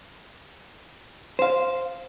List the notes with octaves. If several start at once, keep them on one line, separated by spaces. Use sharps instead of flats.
C5 F5